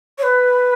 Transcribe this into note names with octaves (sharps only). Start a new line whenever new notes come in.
C#5
B4